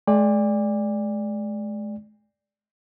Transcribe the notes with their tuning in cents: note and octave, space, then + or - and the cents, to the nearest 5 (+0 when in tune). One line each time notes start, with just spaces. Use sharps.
G#3 +40 D5 +0 G#5 -45